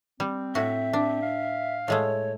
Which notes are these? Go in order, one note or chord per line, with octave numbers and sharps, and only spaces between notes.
G3 C4
A2 F#4 E5
D4
F5
A2 G#3 A3 C#5